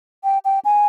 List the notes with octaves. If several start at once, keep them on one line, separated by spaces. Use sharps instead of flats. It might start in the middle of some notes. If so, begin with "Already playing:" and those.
G5
G5
G#5